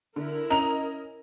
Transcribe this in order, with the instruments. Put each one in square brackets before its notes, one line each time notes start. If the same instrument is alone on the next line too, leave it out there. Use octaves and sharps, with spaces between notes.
[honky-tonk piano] D3 [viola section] E4 A#4
[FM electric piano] C#4 [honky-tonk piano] D#5 F7 [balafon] A#5